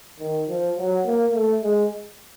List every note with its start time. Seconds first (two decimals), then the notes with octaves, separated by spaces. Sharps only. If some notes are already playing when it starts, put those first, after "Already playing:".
0.20 D#3
0.49 F3
0.77 F#3
1.05 A#3
1.34 A3
1.62 G#3